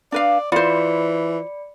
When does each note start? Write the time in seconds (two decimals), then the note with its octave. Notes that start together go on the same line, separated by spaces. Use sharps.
0.12 D4 B4 D5 F5
0.52 E3 F4 C5 D5 B5 C#7